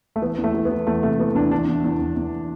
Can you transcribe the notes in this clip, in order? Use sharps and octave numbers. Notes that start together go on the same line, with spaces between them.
A3
E3 B3
E2
A3
E3
B3
E3
E2 A3
C3 A3
E3 B3
E2 D4
E2 D4
E2
E2
E2
E2